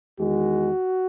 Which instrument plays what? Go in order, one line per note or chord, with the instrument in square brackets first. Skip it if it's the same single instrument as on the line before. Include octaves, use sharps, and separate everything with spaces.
[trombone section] E2 D#3 G#3 F#4